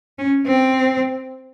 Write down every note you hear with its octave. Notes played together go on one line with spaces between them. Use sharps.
C#4
C4